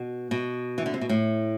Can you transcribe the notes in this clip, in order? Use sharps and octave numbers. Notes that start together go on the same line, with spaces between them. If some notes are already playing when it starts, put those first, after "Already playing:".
Already playing: B2
B2
E3
D3
C3
B2
A2